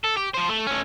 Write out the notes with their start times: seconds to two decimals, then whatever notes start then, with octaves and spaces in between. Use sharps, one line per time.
0.04 A4
0.17 G4
0.34 F3 C5
0.49 A3
0.67 A3 C#4